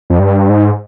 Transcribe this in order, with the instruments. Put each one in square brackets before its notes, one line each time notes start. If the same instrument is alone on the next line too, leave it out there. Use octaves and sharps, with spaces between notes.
[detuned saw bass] F2
G2
G#2